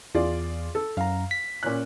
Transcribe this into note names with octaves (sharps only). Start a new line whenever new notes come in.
E2 F4 G#4 D5
A4
F#2 F5 A#5
B6
A#2 C#4 F#6